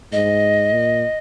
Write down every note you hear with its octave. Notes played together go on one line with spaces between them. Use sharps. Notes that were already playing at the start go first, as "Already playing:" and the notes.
G#2 D#5
A#2